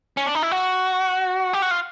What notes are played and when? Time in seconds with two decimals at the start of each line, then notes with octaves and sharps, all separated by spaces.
0.17 C#4
0.26 D4
0.35 D#4
0.43 E4
0.51 F#4
1.53 G4
1.62 F#4
1.71 F4